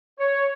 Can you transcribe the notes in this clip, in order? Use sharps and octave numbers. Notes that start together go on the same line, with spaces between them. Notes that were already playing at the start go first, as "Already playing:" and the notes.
C#5